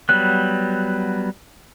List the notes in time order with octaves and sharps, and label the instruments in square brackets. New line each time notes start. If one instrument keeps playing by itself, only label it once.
[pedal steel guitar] F#3 G3 B3 [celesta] F#6